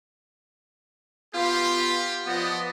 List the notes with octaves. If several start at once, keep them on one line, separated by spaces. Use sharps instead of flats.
B3 F4 G4
F3 B3 D5 D#5